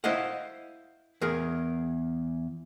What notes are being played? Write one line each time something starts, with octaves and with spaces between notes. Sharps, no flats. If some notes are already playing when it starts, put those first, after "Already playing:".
E4 C5 D#5 F5 F#5
E2 G#4 A#4